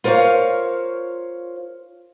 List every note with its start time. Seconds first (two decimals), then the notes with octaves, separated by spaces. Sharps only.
0.04 F4 A#4 C5 C#5 F5